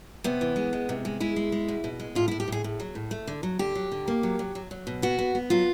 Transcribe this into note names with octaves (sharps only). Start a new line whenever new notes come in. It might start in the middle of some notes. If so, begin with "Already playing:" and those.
C3 B3
E3
G#3
G#3
C3
G#3
G#3 E4
G#3
G#3
B2
B2
G#3
A2 F4
E4
A2
G4
A2 G#4
A2
F#3
A2
A3
D3
F#3
D3 G4
F#3
D3
A#3
F#3
F#3
F#3
F#3
B2
B3 F#4
B3
B3
F#3 F4